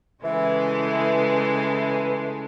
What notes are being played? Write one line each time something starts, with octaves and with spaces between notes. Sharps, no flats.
C#3 E3 G#3 A3